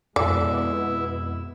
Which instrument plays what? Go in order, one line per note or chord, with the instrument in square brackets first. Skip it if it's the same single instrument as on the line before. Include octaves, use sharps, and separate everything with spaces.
[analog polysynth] F2 B2 [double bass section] G#3 B3 [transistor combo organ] E4 [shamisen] D5